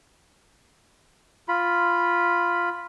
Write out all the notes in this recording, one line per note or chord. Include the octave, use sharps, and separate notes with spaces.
F4 B5